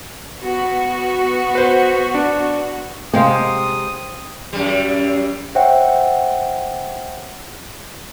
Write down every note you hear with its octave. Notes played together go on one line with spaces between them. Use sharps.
B3 F#4
B4 C5
D4
C3 G#3 C4 F5 D#6
F#2 G3
C5 C#5 E5 F#5 G5